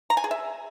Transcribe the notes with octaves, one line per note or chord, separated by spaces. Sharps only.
A#5
G#5
G#4
E5